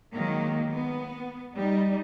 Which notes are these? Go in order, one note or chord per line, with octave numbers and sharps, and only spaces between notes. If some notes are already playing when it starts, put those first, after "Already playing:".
D#3 F#3 G#3 A#3
B3
G3 D#4